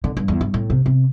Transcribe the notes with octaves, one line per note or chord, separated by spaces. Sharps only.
D3
G2
E2
G2
A2
C3
C3